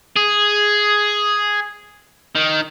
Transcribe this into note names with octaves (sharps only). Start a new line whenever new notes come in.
G#4
D#3